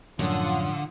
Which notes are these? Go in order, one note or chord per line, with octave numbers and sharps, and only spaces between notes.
F#2 A2 D3 F3 F4 F#5 D#6